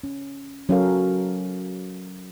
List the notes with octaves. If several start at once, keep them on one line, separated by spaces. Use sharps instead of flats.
C#4
F#3 C#4 F#4 A4 A#4 F5